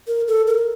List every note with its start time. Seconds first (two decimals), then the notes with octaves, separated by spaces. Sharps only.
0.08 A#4
0.28 A4
0.47 A#4